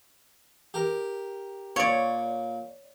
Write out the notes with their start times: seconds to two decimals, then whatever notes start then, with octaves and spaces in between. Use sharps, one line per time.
0.74 G4 A#4
1.76 A#2 C#5 D5